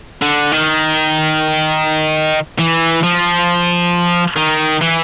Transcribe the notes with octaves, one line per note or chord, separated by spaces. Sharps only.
D3
D#3
E3
F3
D#3
E3